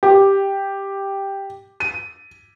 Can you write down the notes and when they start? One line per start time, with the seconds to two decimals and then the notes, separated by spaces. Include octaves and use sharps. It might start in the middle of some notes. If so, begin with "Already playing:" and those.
0.03 G4
1.80 D#7